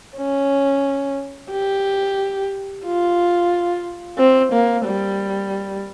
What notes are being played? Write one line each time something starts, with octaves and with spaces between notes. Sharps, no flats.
C#4
G4
F4
C4
A#3
G3